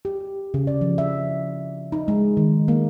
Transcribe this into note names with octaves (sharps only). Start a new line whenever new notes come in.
G4
C#3
D5
F3
E5
D#4
G#3
D#3
A#3